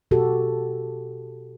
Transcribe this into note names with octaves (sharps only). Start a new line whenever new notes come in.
B2 F#4 G4 A4